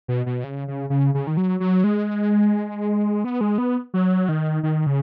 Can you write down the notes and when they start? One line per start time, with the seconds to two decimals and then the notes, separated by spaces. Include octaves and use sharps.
0.08 B2
0.26 B2
0.44 C#3
0.68 C#3
0.90 C#3
1.14 C#3
1.27 D#3
1.37 F#3
1.60 F#3
1.84 G#3
3.24 B3
3.41 G#3
3.58 B3
3.94 F#3
4.29 D#3
4.63 D#3
4.87 C#3